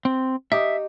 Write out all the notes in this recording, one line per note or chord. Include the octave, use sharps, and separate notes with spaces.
C4
D#4 G4 E5